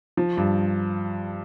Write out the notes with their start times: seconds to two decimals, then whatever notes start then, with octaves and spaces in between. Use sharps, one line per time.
0.17 F3
0.37 G2